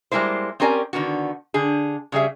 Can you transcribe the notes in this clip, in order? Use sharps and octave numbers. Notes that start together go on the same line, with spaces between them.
G3 G#3 A#3 E4 C5
C4 C#4 G4 A#4 D5 G#5
D3 D#3 B3 F#4
D3 G#4
C#3 G3 G#4 E5